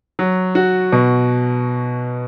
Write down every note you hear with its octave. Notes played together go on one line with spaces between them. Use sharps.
F#3
F#4
B2